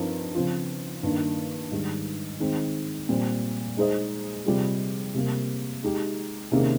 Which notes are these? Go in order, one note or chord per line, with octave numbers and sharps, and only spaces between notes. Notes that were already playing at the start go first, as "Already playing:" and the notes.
Already playing: G2 F3 C4 D#4 A#4
C#3 F3 C4 F4
G2 D#3 A#3
G#2 D#3 G3
D#3 G#3 C4
A#2 G3 C4
G#3 D#4 G#4 C5 D#5
C3 G3 C4 F4 G#4
C3 G3 A#3
G#3 D#4 G4
C3 D#3 A#3 C#4 G#4